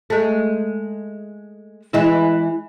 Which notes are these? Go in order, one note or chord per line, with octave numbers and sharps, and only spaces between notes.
G#3 A3
E3 G#3 E4